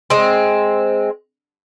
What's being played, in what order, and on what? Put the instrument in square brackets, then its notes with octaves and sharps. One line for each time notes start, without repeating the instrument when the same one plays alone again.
[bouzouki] G#3 C4